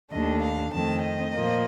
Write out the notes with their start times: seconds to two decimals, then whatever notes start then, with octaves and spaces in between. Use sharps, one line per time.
0.11 D#2 D#3 A3 D4 D#5
0.43 F5
0.73 F2 D#3 A3 C4 A5
1.03 D#5
1.34 A#2 F3 A#3